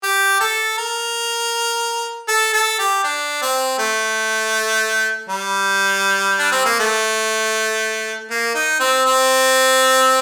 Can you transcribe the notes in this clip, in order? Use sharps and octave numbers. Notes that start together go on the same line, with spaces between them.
G4
A4
A#4
A4
A4
G4
D4
C4
A3
G3
D4
C4
A#3
A3
A#3
D#4
C4
C4